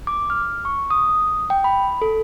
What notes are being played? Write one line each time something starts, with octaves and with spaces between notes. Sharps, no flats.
D6
F6
C#6
D#6
G5
B5
A4